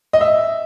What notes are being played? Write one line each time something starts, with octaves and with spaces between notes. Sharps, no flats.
D#5
E5